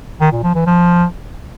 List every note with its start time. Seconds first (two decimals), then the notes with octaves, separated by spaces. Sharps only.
0.21 D#3
0.32 A#2
0.44 F3
0.55 E3
0.66 F3